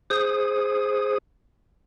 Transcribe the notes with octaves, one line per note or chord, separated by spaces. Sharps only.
G#4 C5 D#6